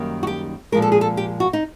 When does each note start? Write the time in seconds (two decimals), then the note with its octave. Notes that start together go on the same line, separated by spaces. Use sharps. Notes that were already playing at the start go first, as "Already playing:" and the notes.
Already playing: F#2 D#3 G3 A#3
0.23 F#4
0.27 G4
0.72 A#2 F3 G#3 A#4
0.82 A4
0.92 G#4
1.01 A4
1.17 G4
1.40 F#4
1.53 D#4